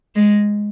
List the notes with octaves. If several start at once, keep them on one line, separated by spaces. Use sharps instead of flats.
G#3